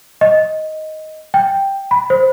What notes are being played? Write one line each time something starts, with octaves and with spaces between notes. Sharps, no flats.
D#5
G5
B5
C5